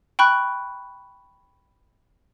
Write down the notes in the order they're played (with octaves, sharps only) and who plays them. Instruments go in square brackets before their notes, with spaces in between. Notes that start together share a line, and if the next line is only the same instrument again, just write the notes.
[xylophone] G5 B5 C#6 F#6